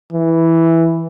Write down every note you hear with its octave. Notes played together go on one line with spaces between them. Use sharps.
E3